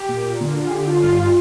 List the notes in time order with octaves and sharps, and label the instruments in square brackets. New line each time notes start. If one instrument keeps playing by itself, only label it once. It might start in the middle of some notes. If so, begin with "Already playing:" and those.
Already playing: [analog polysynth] G4
A#2
D3 A#3
F4
G#4
D3 G4
F4
G2